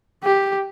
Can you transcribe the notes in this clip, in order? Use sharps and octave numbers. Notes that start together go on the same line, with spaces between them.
G4